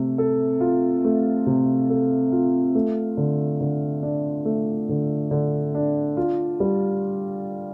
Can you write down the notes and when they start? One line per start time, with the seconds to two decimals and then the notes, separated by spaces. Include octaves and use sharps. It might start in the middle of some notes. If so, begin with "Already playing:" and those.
Already playing: C3 A3
0.18 A4
0.60 F4
1.04 A3
1.46 C3
1.90 A4
2.32 F4
2.75 A3
3.17 D3
3.61 D3
4.02 D4
4.45 A3
4.89 D3
5.31 D3
5.75 D4
6.17 F4
6.60 G3